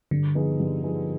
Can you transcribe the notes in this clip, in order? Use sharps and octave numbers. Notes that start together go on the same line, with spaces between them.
G2 D3
F3 B3 D#4 G#4
G2
F3 B3 D#4 G#4